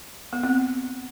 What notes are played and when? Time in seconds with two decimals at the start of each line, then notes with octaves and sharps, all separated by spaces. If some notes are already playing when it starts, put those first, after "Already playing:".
0.33 B3
0.43 C4